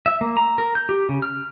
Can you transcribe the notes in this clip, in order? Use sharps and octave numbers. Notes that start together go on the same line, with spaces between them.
E5
A#3
A#5
A#4
G6
G4
C#3
F6